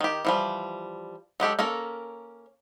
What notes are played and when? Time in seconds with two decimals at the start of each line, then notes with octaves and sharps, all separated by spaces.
0.01 D#3 G4
0.25 E3 F3 G3
1.40 F#3 G#3 G4 A4
1.59 A#3 C#4 A4 A#4